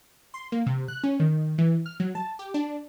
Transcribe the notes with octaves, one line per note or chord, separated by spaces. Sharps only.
C6
A#3
C3
F#6
C#4
D#3
E3
F6
F#3
A5
G4
D4